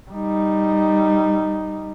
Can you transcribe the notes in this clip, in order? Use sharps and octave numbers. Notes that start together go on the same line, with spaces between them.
G3 D#4